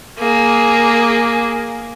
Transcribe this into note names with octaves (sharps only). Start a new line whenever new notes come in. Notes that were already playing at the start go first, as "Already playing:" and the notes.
A#3 G#4